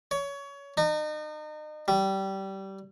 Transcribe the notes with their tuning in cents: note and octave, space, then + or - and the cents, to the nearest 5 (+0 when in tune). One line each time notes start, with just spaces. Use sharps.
C#5 +25
D#4 -35
G3 -20